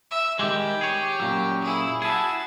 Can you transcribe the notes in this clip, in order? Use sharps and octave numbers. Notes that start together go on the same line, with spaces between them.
E5
D#3 G3 G#3 G4
G#4 C#5
F#2 A#2 F#3
E4 G#4
E4 F#4 G#4 A5